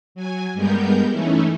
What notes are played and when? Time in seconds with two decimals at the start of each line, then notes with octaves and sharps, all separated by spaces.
0.15 F#3 G#5
0.54 G2 G3 G#3 B3 A#4 G6
1.10 E3 A3 C#4 D#4 E4